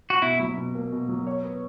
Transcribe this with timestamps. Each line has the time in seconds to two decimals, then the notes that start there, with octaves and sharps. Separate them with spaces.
0.10 F#4
0.21 B2 E4
0.39 F#3
0.57 B2
0.75 A#3
0.92 B2
1.09 F#3
1.27 C#5
1.43 B3